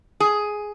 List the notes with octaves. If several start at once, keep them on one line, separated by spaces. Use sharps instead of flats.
G#4